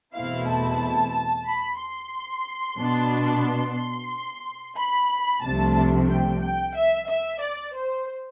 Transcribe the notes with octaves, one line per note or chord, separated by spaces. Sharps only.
E2 B2 A3 C4 E4 F5
A5
B5
C6
B2 B3 D4
C6
B5
C2 C3 F3 A3 D4 A5
G5
G5
E5
E5
D5
C5